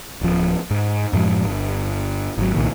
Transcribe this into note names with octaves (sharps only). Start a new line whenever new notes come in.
D1 F3
G#2
F#2 A2 F3 G#3
G1
G#1 F#3
C2 A#2 D#3